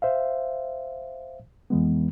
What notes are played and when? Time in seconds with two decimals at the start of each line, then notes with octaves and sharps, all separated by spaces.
0.02 C5 E5 F5
1.70 F2 E3 G#3 B3